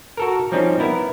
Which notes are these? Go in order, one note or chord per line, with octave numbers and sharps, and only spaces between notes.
F#4 A4 A#4
F3 G3 C4 C#4 D#4
B3 E4 A#4